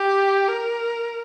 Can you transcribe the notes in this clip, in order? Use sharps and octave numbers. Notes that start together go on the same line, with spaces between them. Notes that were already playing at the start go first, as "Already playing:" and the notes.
Already playing: G4
A#4